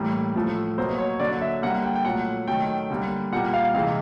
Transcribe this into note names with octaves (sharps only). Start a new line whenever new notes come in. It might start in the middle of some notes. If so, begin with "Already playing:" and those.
Already playing: A2 E3 G3 A#3
A2 F3 A3
B2 F#3 A#3 C5
C#5
D3 F#3 A#3 D5
E5
D3 G3 A#3 F#5
G5
G5
A#2 F#3 A3 F#5
D#3 F#3 A3 G5
D3 G3 A#3
A#2 G3 A#3 F#5
F5
C3 E3 G#3 F5